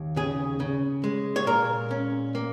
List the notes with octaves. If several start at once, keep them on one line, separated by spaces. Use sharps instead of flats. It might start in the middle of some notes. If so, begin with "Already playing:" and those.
Already playing: D#2
C#3 G#4
C#3
G#3
C#5
A#2 A#4
C#4
A#3